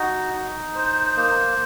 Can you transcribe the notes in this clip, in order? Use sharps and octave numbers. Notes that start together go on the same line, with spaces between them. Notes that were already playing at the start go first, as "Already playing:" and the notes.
Already playing: D#4 F#4
D#4
C5
A#3